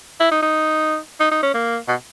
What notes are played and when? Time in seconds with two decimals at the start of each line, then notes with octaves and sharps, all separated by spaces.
0.20 E4
0.31 D#4
0.42 D#4
1.20 D#4
1.31 D#4
1.43 C#4
1.54 A#3
1.88 B2